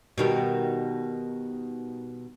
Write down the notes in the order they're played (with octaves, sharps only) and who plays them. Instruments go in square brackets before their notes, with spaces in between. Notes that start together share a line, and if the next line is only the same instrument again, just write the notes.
[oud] B2 D#3 G3